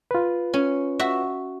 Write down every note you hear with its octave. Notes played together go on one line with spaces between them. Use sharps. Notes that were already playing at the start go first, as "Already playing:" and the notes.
F4 B4
C#4
F#4 E5